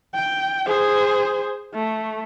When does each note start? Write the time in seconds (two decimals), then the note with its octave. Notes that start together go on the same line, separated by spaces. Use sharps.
0.14 G5
0.66 G#4 C5
1.74 A3